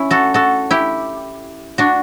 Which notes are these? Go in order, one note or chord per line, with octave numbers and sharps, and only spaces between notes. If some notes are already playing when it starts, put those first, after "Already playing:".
Already playing: C#4 E4
F#4 A4
F#4 A4
E4 G4
D4 F#4